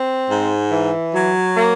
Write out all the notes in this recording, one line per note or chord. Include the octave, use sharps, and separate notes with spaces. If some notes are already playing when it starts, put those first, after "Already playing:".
Already playing: C4
G#2
E3
F#3
A#3